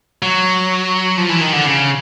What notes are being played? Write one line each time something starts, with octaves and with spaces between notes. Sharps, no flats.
F#3
F3
E3
D#3
D3
C#3